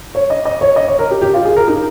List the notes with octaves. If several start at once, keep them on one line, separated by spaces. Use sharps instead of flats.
C#5
D#5
D#5
C#5
D#5
C#5
A#4
G4
G4
F4
G#4
A#4
D#4